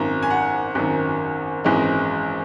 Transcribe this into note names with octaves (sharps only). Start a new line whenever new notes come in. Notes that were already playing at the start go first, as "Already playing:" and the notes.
Already playing: G#1 F#2 D#3 A#5
G#5
F#5
G#1 F#2 D#3
G#1 F#2 E3 G#3